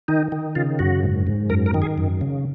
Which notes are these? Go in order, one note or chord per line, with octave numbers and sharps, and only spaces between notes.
D#3 D#4
D#3
C#3 F4
F#2 F#4
G#2
G#2
F#2 A#4
A#4
D#3
G#4
F#2
C#3